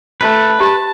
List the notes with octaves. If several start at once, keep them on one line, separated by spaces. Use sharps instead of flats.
A3 B4
G4 A5